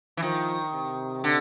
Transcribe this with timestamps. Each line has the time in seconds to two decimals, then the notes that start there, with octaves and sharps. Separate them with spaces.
0.17 E3
0.22 D#3 F3
0.73 C3
1.24 D3